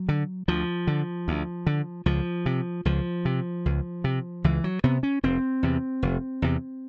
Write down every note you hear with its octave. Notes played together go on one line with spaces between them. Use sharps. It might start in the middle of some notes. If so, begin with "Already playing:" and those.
Already playing: F#3
D3
D2 F3
D3
D2
D3
C#2 F3
C3
C#2 F3
C3
C#2
C3
C#2 E3
F#3
C3 B3
C#4
F1 C4
E2 C3
F1
E2 C3